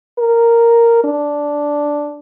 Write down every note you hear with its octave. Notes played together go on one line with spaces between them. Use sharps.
A#4
D4